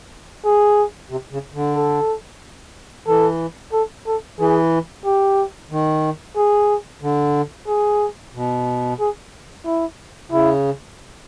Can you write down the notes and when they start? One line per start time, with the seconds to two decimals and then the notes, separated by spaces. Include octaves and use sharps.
0.44 G#4
1.10 C3
1.32 C#3
1.54 D3
1.75 A4
3.07 E3 A4
3.73 A4
4.06 A4
4.39 E3 G#4
5.05 G4
5.71 D#3
6.36 G#4
7.02 D3
7.68 G#4
8.34 B2
8.99 G#4
9.65 E4
10.31 C#3 E4